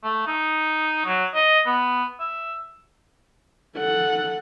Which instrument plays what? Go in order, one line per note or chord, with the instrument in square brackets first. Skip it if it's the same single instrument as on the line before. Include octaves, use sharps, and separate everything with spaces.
[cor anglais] A3
D#4
F#3
D#5
B3
E5
[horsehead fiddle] A4 F#5